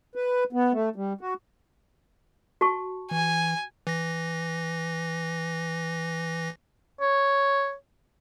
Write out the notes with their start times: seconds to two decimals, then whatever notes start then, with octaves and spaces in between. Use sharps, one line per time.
0.15 B4
0.53 B3
0.72 A3
0.96 G3
1.21 F#4
2.61 F#4 A5 C#6
3.11 E3 G#5
3.87 E3 A#6
7.00 C#5